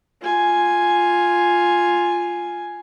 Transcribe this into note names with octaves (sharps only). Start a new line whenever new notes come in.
F4 G#5